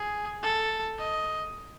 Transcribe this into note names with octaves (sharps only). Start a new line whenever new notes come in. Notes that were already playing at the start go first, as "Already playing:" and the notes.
Already playing: G#4
A4
D#5